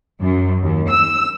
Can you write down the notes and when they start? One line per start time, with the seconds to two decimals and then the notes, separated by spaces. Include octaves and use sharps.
0.22 F#2
0.63 D#2
0.91 E6